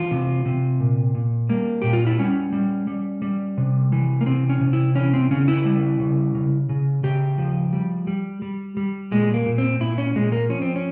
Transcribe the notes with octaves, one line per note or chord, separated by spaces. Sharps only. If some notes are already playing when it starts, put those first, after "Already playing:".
Already playing: E3 F4
C3
C3
A#2
A#2
G3 A#3
A#2 G4
F4
E4
G3 C#4
G3
G3
G3
C3
E3
A#3
C3 C4
C#4
C3
E4
E3 C#4
C4
C#3 C#4
E4
G3
C#3
C#3
C#3
C#3 G4
F3
G3
G3
G3
G3
A#2 G#3
A#3
A#2
C4
A#2 E4
C#4
A#2 G#3
A#3
F3 C#4
C4
C#4